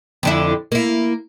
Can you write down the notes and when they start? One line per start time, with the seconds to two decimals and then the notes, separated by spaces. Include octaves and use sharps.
0.23 F2 D3 E4
0.72 A#3 E4